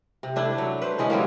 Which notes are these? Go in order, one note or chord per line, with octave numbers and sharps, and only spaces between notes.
C3
A3 D4 E4
F#3
B4 C5
E3 G#3 B3 C#4
E3 F#3 G3 A#3